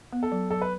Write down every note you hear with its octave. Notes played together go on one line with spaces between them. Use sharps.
B3
A4
F#3
F#3 A4
B4